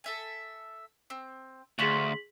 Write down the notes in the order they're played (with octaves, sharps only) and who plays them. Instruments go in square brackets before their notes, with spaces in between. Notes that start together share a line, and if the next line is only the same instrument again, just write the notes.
[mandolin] A4 E5 G#5
C4
[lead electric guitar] D2 [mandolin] F4 C6 C#6 [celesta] G#4 B6 F#7